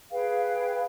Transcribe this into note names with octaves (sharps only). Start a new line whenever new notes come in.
G#4 B4 F5 G5